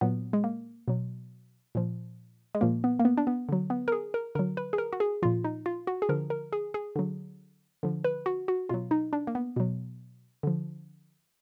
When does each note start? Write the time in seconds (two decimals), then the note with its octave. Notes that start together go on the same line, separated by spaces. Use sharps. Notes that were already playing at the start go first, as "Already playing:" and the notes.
0.01 A#2 F#3 B3
0.33 G#3
0.44 A#3
0.88 B2 F#3
1.75 A#2 F3
2.55 G#3
2.61 A#2 F3 A#3
2.84 B3
2.99 A#3
3.05 B3
3.17 D4
3.27 B3
3.49 D3 F#3
3.70 B3
3.88 A#4
3.92 G#4
4.14 A#4
4.35 D3 F#3 A#4
4.57 B4
4.73 G#4
4.78 A#4
4.93 F#4
5.00 G#4
5.22 A#2 F3 F4
5.44 D#4
5.66 F4
5.87 F#4
6.02 G#4
6.09 D3 F3 A#4
6.30 A#4
6.53 G#4
6.74 G#4
6.96 D3 F#3
7.83 D3 F3
8.04 B4
8.26 F#4
8.48 F#4
8.69 B2 F#3 F4
8.91 D#4
9.13 D4
9.27 A#3
9.35 B3
9.56 B2 F#3
10.43 D3 F3